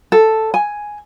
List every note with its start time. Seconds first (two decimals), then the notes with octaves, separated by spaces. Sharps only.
0.12 A4
0.54 G#5